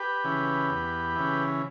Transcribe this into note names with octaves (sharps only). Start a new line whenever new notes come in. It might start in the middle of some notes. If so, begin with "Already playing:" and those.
Already playing: G4 B4
C#3 E3
E2
C#3 E3